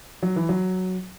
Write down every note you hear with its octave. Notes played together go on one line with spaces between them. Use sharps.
F#3
E3
F#3